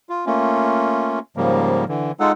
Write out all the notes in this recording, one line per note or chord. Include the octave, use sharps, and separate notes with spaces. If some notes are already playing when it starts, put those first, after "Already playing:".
F4
A3 A#3 C#4 F4
G#2 C#3 F3 G3 A#3
D3 E3
G#3 D#4 F4 A4 F#5